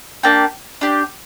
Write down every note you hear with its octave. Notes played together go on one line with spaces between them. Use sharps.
A#3 D4 G4
D4 G4